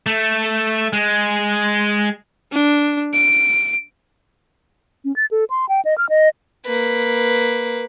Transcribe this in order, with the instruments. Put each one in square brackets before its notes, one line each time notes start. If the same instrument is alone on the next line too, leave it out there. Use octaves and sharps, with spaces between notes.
[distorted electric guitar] A3
G#3
[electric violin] D4
D7
[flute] C#4
A6
A4
C6
G5
D#5
F6
D#5
[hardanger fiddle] A#3 B4